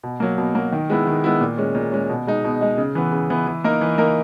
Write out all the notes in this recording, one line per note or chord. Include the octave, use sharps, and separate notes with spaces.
B2
F#3 A#3
B2
F#3 A#3
D#3
G#3 B3 E4
D#3
G#3 B3 E4
A#2
G#3 C#4
A#2
G#3 C#4
B2
G#3 D#4
B2
G#3 D#4
C#3
E3 B3
C#3
E3 B3
E3
A#3 D#4 A#4
E3
A#3 D#4 A#4